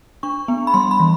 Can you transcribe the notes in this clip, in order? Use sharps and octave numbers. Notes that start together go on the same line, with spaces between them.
D4 C#6
B3
B5
G3 C6
B5
E3